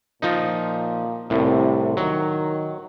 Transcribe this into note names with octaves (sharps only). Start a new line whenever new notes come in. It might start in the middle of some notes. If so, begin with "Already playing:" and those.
A#2 F3 D#4
C2 A2 C3
D#3 F#3